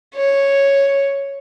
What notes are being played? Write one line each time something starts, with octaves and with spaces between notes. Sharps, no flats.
C#5